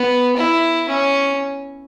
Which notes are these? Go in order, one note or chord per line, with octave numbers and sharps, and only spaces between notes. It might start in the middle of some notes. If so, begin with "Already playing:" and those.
Already playing: B3
E4
C#4